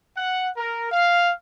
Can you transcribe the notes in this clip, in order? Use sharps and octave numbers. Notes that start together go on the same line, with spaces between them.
F#5
A#4
F5